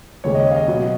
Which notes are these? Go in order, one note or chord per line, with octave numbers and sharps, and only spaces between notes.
D#2 C#3 G#3 C#5
D#5
C#5 F5
D#5
B2 F#3 B3 D#5